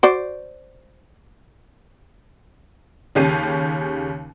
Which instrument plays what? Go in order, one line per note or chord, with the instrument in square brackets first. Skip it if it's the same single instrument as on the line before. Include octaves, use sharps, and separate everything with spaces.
[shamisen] F#4 C5 D5
[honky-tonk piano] D#2 C#3 C#4 G4 C7 D#7